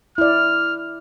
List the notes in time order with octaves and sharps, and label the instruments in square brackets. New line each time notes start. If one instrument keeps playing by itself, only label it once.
[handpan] E4 D5 [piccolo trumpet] F6